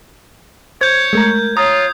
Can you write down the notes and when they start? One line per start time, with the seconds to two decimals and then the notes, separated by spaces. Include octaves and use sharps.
0.81 C5 C#5 G6 G#6
1.13 G#3 A3 A#4 A#5
1.57 F4 C#5 A#5 D#6